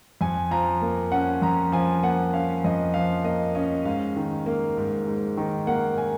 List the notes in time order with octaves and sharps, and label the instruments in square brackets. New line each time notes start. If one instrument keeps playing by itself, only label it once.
[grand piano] F2 G#5
F3 A#5
A#3
C#4 F#5
F2 A#5
F3 G#5
A#3 F#5
C#4 F5
F2 D#5
F3 F5
A#3 D#5
C#4 D#5
G#2 F5
D#3
A#3
G#2
G#2
D#3
A#3 F#5
G#5